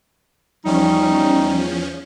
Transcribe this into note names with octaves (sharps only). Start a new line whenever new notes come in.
E2 F3 G3 C#4 D#4